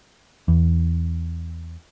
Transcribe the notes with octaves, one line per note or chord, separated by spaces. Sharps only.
E2